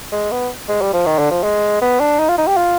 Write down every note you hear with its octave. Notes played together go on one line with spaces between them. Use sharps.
G#3
B3
G#3
G3
F3
D#3
D3
F3
G#3
B3
D4
D#4
F4
D#4
G4
F4